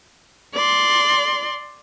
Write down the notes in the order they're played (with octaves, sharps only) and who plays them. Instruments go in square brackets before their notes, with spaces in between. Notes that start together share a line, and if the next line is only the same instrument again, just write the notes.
[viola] D5 C6